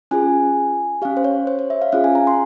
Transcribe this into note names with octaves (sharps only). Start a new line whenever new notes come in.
C#4 F4 G#4 G#5
C#4 G4 F5
C5
C#5
C5
C#5
E5
F5
C#4 F4 G#4 F5
G#5
A#5
C6